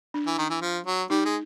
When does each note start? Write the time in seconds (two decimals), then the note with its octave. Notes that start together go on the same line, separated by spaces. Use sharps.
0.14 D4
0.27 E3
0.38 D#3
0.50 E3
0.62 F3
0.86 F#3
1.10 G3 D#4
1.25 G#3